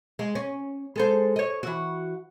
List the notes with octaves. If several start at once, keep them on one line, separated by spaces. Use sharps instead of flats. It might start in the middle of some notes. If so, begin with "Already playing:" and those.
G#3
C#4
G#3 A4 C5
C#5 D#5
E3 F#4